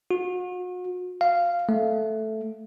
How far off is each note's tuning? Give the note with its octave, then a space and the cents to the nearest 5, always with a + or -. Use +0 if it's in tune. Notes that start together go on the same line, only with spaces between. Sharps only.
F#4 -40
F5 -10
A3 -5